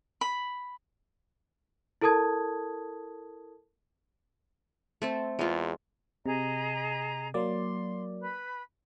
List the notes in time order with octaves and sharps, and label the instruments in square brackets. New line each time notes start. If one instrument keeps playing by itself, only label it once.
[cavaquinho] B5
[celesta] E4 A4 A#4 A5 D#6 G#6
[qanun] A3 C4 A4
[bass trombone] E2 [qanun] G#3 F4
[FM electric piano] C3 [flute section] G#4 D#5 A#5
[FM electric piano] F#3 A#3 D5 [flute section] C6
[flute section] B4 B5